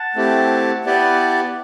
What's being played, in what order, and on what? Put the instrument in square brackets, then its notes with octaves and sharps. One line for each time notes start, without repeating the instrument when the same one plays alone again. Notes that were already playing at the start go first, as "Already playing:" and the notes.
Already playing: [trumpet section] F#5 A5
[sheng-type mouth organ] A3 C4 E4 G4
B3 E4 G4 B4 D5